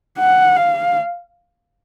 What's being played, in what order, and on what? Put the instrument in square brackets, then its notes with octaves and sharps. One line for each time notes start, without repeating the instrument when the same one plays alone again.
[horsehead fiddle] F#5
F5